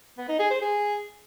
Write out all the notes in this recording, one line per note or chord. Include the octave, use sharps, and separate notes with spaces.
B3
D#4
G#4
C5
G#4